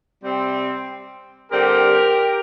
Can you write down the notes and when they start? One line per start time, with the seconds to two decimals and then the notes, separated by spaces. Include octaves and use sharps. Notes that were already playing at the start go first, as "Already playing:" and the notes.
0.24 C3 G3 C4
1.51 D3 G3 C4 G4 A#4